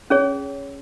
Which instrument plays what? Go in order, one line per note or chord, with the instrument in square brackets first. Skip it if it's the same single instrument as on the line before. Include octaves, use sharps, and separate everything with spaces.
[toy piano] C#4 G#4 C#5